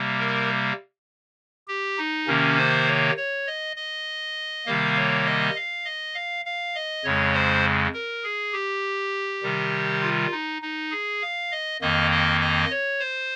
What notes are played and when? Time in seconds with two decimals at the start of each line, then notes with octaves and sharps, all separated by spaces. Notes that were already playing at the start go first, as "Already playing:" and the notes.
Already playing: C3 G3 A#3
0.19 A#4
1.68 G4
1.98 D#4
2.27 C3 D#3 A#3 C#4
2.58 C5
2.87 C#5
3.17 C#5
3.47 D#5
3.76 D#5
4.66 C3 D#3 G3 A#3 F5
4.96 C#5
5.26 D#5
5.56 F5
5.85 D#5
6.15 F5
6.45 F5
6.75 D#5
7.04 F2 C#3 G#3 C#5
7.34 C5
7.94 A#4
8.24 G#4
8.53 G4
9.43 C3 D#3 G3
10.02 F4
10.32 D#4
10.62 D#4
10.92 G#4
11.22 F5
11.51 D#5
11.81 F2 D#3 A#3 D#5
12.11 D#5
12.40 D#5
12.70 C#5
13.00 C5